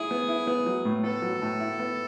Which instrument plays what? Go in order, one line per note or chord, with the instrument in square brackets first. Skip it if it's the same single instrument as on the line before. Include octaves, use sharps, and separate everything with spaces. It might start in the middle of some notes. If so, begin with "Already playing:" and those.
Already playing: [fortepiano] E4 [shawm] G#4
[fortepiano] B3
E4
B3
F#3
A2
[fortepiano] B3 [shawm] A4
[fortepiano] F#3
A2
E4
B3